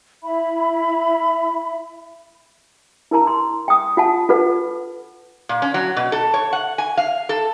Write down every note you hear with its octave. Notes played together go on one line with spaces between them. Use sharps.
E4 E5 B5
E4 A#4 A5 A#5
C6
G5 D#6
F4 F#5 A5
F4 A4 B4 F#5
A#2
C#4
F#3
B2
A4
C#5
F#5
G#5
F5
A4